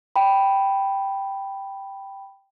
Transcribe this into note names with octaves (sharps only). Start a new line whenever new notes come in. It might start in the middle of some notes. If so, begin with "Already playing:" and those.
G5 B5